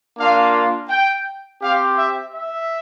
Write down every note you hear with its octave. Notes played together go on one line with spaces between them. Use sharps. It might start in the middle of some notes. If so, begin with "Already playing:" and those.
A#3 D4 F4 F5
G5
C4 G4 F5
E5
E5